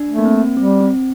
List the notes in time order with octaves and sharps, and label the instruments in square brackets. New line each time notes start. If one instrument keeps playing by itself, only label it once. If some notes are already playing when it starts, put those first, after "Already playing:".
Already playing: [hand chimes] D4
[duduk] A3
[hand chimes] A#3
C4
[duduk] G3 [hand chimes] C4
[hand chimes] C4